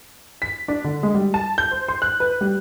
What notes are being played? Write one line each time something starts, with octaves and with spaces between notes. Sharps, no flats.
B6
D4
D3
G#3
G3
A5
G6
C5
C6
F#6
B4
G3